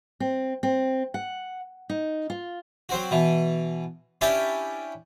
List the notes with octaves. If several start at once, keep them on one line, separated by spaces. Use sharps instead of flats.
C4
C4
F#5
D#4
F4
F#3 C4 F#4
B2 E3
C#4 D4 E4 G4 E5 A5